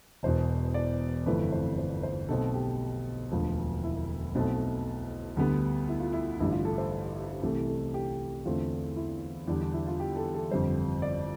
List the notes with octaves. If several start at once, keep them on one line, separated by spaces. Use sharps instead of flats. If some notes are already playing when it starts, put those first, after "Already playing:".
E1 E2 B2 C5
D5
G1 F2 E3 A3 C4 B4
C5
C5
C5
B1 B2 A3 C4 A4
G4
E1 D2 D3 F3
E4
B1 B2 A3 C4
D2 D3 G3 B3
E4
F4
E4
A1 G2 D3 E4
F4
A4
C5
C2 C3 E3 A3
A4
G4
E2 D3 A3 C4 F4
E4
E2 D3 G3 D4
D4
E4
F4
G4
A4
A4
G1 F2 D3 G3 C5
D5